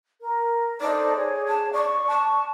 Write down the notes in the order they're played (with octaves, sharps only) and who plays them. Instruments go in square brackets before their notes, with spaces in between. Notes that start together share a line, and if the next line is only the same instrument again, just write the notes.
[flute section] A#4
[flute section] D#4 A4 C5 [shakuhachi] D5
[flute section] G#4 C#5
[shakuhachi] A5
[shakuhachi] D5 [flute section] C#6
[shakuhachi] A5